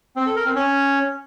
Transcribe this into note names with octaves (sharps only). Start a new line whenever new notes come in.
C4
A4
A#4
C4
C#4